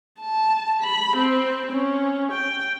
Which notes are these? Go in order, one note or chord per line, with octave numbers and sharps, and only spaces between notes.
A5
B5
C4
C#4
G5